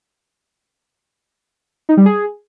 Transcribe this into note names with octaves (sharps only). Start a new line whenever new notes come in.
D#4
G3
G#4